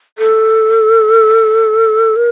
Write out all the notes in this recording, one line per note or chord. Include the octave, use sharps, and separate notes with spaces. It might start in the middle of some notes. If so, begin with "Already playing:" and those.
A4
A#4